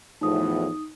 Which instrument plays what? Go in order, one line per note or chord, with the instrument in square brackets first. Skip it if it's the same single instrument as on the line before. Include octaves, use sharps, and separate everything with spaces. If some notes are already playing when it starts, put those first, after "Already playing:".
[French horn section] E2 A2 F3 [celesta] D#4 D#6